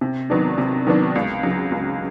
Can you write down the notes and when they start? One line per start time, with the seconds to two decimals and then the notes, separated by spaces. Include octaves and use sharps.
0.01 C3
0.30 D#3 F#3 B3 D4
0.58 C3
0.87 D#3 F#3 B3 D4
1.15 C#2
1.43 C#3 F#3
1.71 C#2